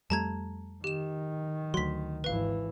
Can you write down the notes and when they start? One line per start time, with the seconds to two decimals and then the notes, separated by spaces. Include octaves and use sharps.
0.10 F2 G3 A3 A5 A#5 G#6
0.84 D#3 G4 E7
1.74 D2 F#3 C6 B6
2.24 G#1 E3 B4 F5